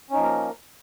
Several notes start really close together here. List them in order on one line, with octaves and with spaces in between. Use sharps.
C#4 D#4 F3 A#3 A#4